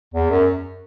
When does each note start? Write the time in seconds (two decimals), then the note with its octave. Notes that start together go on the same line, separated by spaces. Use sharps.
0.14 E2
0.30 F#2